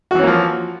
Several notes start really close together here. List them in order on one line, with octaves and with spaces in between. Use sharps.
F#4 E3 C#4 A#3 F3